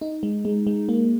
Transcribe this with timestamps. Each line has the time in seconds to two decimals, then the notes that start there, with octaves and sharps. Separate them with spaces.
0.01 D#4
0.23 G#3
0.45 G#3
0.67 G#3
0.89 A#3